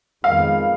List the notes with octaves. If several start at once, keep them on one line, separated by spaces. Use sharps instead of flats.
F2 D#3 G#3 B3 F5